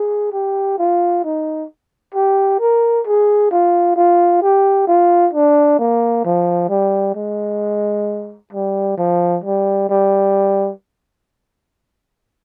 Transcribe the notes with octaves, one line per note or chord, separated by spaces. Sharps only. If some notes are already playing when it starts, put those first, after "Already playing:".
Already playing: G#4
G4
F4
D#4
G4
A#4
G#4
F4
F4
G4
F4
D4
A#3
F3
G3
G#3
G3
F3
G3
G3